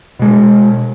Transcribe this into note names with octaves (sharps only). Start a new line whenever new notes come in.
B2 G#3